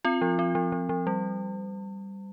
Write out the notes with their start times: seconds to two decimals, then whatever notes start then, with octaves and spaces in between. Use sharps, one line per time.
0.05 C4 F4
0.22 F3
0.39 C4
0.55 F3
0.72 F3
0.89 F3
1.07 G3